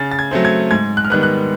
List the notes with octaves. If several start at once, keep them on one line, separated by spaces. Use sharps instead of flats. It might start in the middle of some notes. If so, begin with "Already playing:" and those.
Already playing: C#3 A6
A6
G#6
F#3 A3 C4
G#6
G#2 G#6
F#6
F6
D#3 G3 B3 F#6
F#6